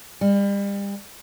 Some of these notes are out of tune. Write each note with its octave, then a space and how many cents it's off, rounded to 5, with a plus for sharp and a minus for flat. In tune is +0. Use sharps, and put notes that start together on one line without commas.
G3 +35